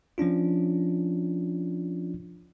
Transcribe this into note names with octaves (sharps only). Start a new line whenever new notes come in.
F3 C#4 D4 F4